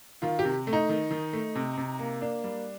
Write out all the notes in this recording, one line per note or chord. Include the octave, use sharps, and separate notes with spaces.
D#3 F4
G4
C3
A3
D#4
D#3
D#3
A3
C3
C3
A#3
A#3 D4
G3